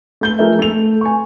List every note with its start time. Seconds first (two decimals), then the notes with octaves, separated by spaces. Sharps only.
0.21 A3 G6 G7
0.39 F3 A3 G#4 A#4 E5
0.59 A3 F7
1.01 G#5 C#6